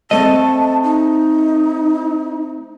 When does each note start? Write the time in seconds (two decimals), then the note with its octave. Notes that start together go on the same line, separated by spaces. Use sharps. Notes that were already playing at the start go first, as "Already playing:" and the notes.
0.11 A3 C4 D#5 A5
0.83 D#4